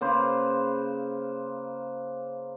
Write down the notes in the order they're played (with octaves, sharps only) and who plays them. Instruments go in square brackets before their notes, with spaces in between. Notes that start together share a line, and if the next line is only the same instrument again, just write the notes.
[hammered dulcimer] C#3 A#3 B4 C5